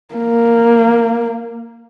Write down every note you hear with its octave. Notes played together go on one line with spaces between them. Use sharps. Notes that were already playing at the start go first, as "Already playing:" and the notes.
A#3